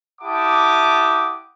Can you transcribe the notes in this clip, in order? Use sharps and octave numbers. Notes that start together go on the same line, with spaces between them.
E4 G4 F#5 A5 D6 D#6